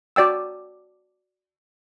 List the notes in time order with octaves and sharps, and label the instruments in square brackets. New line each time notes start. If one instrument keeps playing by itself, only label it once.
[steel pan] F#4 D5 G5 E6